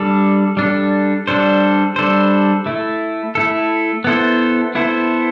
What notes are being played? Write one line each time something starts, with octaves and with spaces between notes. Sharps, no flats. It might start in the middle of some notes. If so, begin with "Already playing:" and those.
Already playing: G3 D4 A4
G3 D4 A4
G3 D4 A4 C5
G3 D4 A4 C5
A3 E4 A4
A3 E4 A4
B3 E4 A4 C5
B3 E4 A4 C5